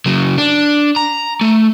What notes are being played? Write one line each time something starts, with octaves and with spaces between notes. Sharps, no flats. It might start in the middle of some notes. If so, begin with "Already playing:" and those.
C#3 F#3
D4
A#5
A3